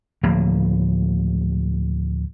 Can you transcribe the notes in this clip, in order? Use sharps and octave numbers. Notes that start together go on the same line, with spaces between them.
D2 A2 F3 A#3